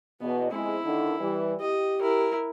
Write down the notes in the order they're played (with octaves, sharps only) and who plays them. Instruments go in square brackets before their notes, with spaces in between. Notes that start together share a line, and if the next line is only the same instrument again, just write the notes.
[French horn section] E2 B2 D#5 [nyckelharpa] B3
[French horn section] F2 G#3 C4 [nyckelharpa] E4
[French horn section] D3 D#3
E3 G3
[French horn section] G4 [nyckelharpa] D#5
[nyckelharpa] E4 A#4